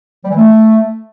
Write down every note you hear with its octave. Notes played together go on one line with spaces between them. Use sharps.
G3
E3
A3